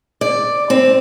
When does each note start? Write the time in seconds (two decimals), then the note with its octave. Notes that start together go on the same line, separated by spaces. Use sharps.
0.21 D5
0.70 C4